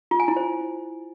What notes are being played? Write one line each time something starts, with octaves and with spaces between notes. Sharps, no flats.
F4
G#5
E4
C5